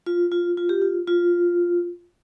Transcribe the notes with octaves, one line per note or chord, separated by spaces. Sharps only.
F4
F4
F4
G4
F4
F4